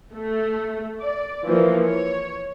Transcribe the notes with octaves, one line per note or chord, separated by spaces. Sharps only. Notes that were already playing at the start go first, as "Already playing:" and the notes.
A3
D5
E3 F3 A#3
C#5